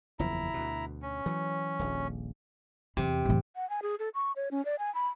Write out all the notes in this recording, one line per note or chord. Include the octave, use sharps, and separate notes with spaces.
F#1 E2 F3 E4 A#5
D2 B2
C#4
E3 F#3
D#1 A#1
E2 C3
A1 E2
F#5
G#5
G#4
A4
C#6
C#5
C#4
D5
G#5
B5